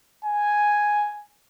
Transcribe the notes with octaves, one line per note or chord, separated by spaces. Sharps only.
G#5